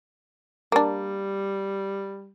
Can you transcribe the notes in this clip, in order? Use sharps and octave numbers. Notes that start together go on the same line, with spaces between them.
G3 A#3 D4